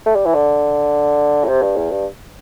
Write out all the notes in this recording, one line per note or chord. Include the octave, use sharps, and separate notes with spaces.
A3
G3
E3
D3
A2
C3
G2
E2
G2